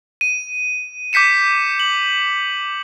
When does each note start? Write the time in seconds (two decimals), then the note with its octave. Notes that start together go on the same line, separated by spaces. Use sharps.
0.21 D#7
1.13 D6 G6 B6 C#7 E7
1.80 F#7